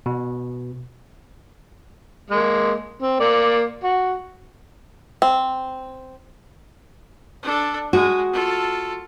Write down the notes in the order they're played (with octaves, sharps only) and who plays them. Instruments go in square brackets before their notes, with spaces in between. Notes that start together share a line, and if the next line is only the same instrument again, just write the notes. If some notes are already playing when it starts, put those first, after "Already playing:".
[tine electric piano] B2
[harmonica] G#3 A#3
C4
A#3 D5
F#4
[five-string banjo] C4
[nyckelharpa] D4 A4
[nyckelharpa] G#3 [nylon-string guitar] F#4
[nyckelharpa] F4 A4